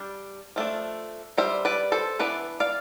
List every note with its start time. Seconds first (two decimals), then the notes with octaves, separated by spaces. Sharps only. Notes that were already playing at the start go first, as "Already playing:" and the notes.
Already playing: G3 D4
0.56 F3 A3 D4
1.37 G3 D4 C5 E5
1.65 B4 D5
1.92 A4 C5
2.19 E3 B3 D4 B4 D5
2.60 D5 F5